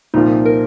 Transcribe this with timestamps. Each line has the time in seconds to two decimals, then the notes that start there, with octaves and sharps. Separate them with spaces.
0.14 C2 A#2 F3 A#3 D#4 F4
0.46 A#4